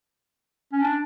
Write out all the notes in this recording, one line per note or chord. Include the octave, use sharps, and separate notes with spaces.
C#4
D4